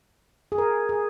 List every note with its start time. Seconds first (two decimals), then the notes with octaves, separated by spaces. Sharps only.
0.52 G#4
0.58 A#4
0.89 G#4